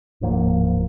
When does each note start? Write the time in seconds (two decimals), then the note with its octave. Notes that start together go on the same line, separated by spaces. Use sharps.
0.21 D1 G#2 F3 A#3